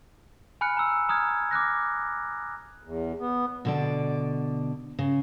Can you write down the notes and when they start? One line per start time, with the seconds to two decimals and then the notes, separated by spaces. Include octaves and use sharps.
0.61 G#5 B5 F6 F#6 C#7
0.77 A#5 E6
1.09 A#5 D#6 F6 G#6
1.51 D6 F6 F#6 A#6
2.84 E2
3.19 B3
3.65 B2 D3 D5
4.99 C#3